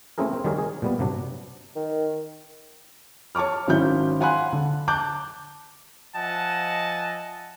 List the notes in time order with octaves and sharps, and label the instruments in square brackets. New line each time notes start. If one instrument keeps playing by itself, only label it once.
[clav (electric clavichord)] A3 C4 C#4 E4 G#4 A#4
C4
D#3 F#3 G3 G#4 A#4 C#5
G#4
A#2 G3 B3
G2 C3 F#3 D4
[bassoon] D#3
[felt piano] C#5 A5 C#6 D6 F6
G#1 F#3 C#4 E4 G6
F5 F#5 G#5 B5 C6 F#6
D3
A5 D6 F#6 G6
[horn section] F3 D#5 E5 F#5 G#5 A5